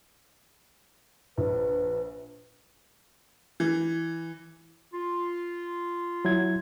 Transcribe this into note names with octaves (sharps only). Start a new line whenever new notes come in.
A#1 B4
E3
F4
F#3 E4 G#6